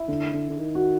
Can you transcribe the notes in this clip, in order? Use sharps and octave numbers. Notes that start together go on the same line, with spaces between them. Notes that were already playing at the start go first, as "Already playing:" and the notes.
Already playing: E4
D3
D3
D3
D#3
F#4